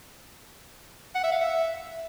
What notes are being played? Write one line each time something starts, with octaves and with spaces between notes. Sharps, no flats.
F#5
E5
F5
E5